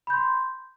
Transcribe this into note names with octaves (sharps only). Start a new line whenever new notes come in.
B5 C6 G6